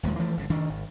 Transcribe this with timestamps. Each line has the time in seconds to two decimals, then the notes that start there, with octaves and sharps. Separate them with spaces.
0.03 D#1 D#2 F3 G#3
0.19 E3 F3 A3
0.37 G1 C#3
0.50 D2 D#3 D4
0.69 G#1